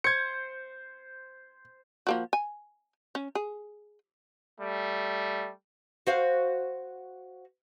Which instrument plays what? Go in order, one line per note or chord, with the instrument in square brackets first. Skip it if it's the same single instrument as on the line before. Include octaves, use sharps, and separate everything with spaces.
[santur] C5 [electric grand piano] G#6 C#7
[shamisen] F3 A#3 F#4
G#5
C#4
G#4
[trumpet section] G3 A3
[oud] F#4 C5 F5